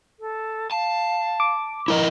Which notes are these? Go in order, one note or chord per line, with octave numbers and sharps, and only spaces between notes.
A4
F5 A5
D6
E4 A#4 D#5 A#5